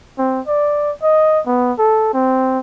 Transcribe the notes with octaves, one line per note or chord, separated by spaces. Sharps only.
C4
D5
D#5
B3
A4
C4